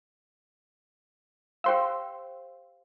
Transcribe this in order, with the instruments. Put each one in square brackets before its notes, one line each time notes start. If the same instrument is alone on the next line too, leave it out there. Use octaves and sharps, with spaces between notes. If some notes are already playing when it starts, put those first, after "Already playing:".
[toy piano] G4 C5 F5 [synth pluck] G5 C6 E6